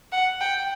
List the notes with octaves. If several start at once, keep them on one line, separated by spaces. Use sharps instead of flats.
F#5
G5